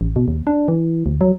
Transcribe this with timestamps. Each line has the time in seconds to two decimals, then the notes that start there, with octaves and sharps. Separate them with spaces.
0.01 A1
0.16 B2
0.28 D#2
0.47 D4
0.68 E3
1.06 D2
1.21 F#3